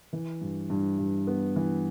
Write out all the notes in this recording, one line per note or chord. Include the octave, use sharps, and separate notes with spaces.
E3
G2
G2
G2
B3
E3